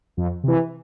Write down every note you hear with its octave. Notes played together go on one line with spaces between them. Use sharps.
F2
C3 E3